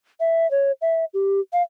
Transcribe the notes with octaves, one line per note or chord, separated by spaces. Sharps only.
E5
C#5
E5
G4
F5